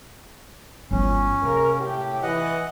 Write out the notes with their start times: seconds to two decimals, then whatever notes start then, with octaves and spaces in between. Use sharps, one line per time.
0.91 G1 E3 C#4
1.43 C3 G#3 A#3 A#4
1.80 A2 G4
2.23 E3 D#5 F#5